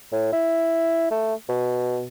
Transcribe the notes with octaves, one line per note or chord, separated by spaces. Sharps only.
A2
E4
A3
B2